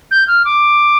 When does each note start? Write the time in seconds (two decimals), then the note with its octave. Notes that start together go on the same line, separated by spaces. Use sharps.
0.11 G6
0.28 F6
0.45 D6